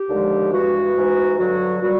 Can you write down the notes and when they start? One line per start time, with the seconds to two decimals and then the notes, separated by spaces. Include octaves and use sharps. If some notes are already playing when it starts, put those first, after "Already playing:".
Already playing: G4
0.09 D#2 D3 F3 G#3
0.52 G2 E3 G#3 F#4
0.94 G#2 E3 G#3
1.37 G2 D3 F#3 F#4
1.80 A#2 G3 F#4